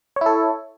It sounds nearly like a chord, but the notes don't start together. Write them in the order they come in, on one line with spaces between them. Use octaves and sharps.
C#5 E4 A4